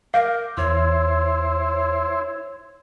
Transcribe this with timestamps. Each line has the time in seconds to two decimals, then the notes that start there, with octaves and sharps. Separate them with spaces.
0.14 A#4 F5 D6 G6 A#6
0.57 E2 E4 C5 C#5